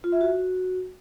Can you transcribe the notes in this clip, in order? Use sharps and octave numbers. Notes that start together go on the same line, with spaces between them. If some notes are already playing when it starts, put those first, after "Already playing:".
F4
E5
F#4